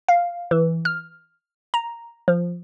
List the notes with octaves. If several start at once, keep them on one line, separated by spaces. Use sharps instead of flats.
F5
E3
F6
A#5
F3